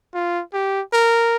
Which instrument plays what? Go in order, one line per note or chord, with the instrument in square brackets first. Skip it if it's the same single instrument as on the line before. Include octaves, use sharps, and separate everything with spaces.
[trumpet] F4
G4
A#4